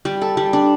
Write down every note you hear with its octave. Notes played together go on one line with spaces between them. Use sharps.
G3
A4
G3
D4